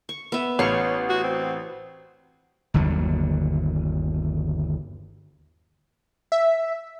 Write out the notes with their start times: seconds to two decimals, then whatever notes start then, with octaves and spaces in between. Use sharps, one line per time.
0.09 C#6
0.32 B3 E5
0.59 A1 C#4 F5 C#6
1.09 F#4
1.23 C4
2.74 G1 D#2 D3 F#3
6.32 E5